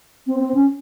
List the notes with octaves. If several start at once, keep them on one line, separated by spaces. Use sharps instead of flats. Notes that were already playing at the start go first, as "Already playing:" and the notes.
C4
C4
C#4